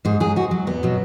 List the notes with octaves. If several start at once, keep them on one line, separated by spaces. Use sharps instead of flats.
G#2 G#4
F#3 G#4
G#2 F#4
F#3
E2 B3
B2 F#3